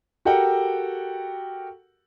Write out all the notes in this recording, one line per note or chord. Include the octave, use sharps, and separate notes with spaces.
F#4 G4 A4 A#4 F#5 G5